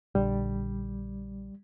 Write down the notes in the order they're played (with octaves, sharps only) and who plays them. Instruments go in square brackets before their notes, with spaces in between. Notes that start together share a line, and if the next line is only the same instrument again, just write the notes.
[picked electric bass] A#1 D3 [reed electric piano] G3